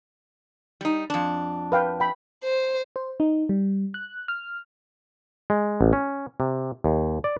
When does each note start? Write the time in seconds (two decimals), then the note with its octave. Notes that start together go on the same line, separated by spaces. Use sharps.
0.81 G3 D#4
1.10 F2 D4
1.72 B4 F5 G5
2.00 G5 B5
2.44 C5
2.96 C5
3.20 D#4
3.49 G3
3.94 F#6
4.28 F6
5.50 G#3
5.81 A1
5.93 C#4
6.40 C3
6.84 D#2
7.24 D5